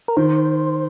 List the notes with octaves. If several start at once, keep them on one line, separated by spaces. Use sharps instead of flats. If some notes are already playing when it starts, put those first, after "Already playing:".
A#4
D#3 C5